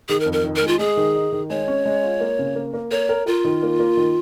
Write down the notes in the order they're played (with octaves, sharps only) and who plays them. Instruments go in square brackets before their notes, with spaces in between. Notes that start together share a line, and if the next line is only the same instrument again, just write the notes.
[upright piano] D#3 [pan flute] G#4
[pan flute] A#4
[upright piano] F2
[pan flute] A#4
[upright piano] D#3
[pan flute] A#4
[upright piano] G#3
[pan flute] F4
[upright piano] G#3 [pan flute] G#4
[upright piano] D#3
D#4
D#3
[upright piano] G#3 [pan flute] C#5
[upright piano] C#4
G#3
F4
A#3
C#3
A#3
A#3
[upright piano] A#4 [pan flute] C#5
[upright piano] A#4
[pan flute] F4 [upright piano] A#4
[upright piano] D#3
A#3
A#3
D#3